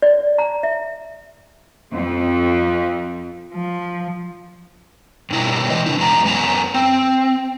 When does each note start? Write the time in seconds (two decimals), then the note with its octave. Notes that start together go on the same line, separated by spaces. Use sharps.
0.02 D5
0.38 A#5
0.63 E5
1.92 F2
3.54 F3
5.30 G2 B2 E4 A#4
5.70 B2 E3 D#5
5.86 C#3 D4 E4
5.98 E2 G#3 A#5
6.25 F#2 B3 G#5 A#5
6.74 C4